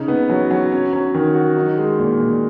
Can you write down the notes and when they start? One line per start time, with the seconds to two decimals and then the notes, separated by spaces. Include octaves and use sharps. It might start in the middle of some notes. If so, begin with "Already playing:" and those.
Already playing: C#3 D#4
0.08 B3
0.29 F#3
0.51 F#3
0.72 C#4
0.93 F#3
1.14 D#3
1.34 F#4
1.57 D#4
1.78 G#3
1.99 A#2
2.20 A#2